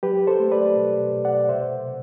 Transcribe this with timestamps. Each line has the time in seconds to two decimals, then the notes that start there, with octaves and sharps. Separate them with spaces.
0.03 F#3 G4 B4
0.27 A4 C5
0.40 A3
0.52 B4 D5
0.76 B2
1.12 B2
1.25 D5 F#5
1.49 C3 C5 E5
1.86 C3